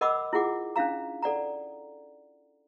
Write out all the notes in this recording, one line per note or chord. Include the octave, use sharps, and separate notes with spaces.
A#4 D#5 F#5 B5 D6 E6
E4 F4 G#4 F#5 D6
C#4 D4 E4 F5 A#5
A4 D5 F#5 A#5